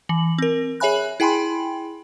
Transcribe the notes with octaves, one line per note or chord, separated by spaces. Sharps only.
E3 F#7
C4 A#4
G#4 C#5 E5 G#5 B5 F#6
E4 G#4 G5 G#5 B5 C6